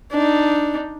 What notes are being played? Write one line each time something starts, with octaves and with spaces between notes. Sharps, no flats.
D4 D#4